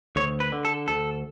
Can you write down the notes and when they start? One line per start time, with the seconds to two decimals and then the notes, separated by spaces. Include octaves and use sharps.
0.16 D2 C#5
0.40 B4
0.52 D3
0.65 A4
0.88 D2 A4